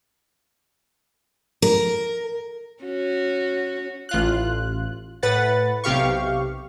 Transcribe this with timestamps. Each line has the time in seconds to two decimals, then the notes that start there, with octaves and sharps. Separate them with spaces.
1.62 A#4
2.83 C#4 F#4
4.09 A1 F4 F#6
5.23 A2 B4 F#5 A6
5.84 B1 C3 G4 F5 C#6